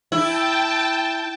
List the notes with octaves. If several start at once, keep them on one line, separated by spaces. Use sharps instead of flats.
E4 G5 A5